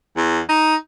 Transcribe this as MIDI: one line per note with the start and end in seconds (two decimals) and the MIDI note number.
0.17 0.40 40
0.49 0.75 63